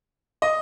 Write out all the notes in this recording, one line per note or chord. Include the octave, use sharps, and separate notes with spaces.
D#5